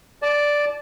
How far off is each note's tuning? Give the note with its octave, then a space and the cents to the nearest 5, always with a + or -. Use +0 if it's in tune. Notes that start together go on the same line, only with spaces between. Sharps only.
D5 +0 A5 -25